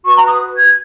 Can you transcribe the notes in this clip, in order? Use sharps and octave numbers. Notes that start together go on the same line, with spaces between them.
F#4 B4 C#6
A#5
D#6
G#6